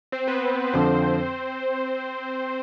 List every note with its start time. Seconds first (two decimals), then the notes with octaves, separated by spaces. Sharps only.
0.12 C4 C5
0.27 B3 B4
0.73 F2 D3 F3 C4 C5